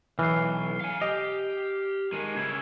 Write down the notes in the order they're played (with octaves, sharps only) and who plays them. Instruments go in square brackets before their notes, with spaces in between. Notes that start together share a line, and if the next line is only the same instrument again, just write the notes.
[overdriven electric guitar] B1 [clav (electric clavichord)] E3 [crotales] F6 C7
[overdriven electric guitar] F5 G#5
[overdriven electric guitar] G4 [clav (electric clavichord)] D#5 [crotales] C7 F7
[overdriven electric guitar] D#3 G#3 [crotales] D#7
[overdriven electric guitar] C#3 E4 [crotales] G#6